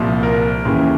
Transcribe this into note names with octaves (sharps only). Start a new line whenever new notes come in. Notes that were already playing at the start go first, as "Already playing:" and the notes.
Already playing: C2 A#2 F3
A#4
D#2 C#3 E3